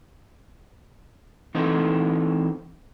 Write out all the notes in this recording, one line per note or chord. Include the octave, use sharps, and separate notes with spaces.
E3 C4 D#4 A4 C5